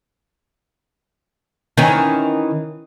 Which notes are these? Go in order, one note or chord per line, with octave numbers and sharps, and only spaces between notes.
D#3 E3 C#4